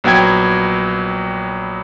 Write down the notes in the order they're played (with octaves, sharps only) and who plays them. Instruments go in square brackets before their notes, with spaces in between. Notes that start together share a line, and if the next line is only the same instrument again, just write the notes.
[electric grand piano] A#1 F#3 B3 G5 G#6